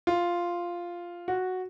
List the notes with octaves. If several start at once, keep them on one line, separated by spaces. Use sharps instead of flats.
F4
F#4